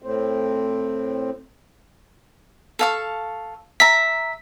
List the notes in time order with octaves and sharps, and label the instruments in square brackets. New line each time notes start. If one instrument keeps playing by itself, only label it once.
[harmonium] A2 C4
[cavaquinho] A4 F5 C#6
[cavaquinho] E5 A#5 [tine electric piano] B6